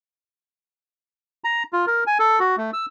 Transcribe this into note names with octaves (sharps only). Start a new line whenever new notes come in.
A#5
F4
A#4
G#5
A4
F#4
A3
E6